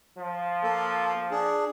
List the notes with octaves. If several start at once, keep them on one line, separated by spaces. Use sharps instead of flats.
F3
A#3 A4
D4 G#4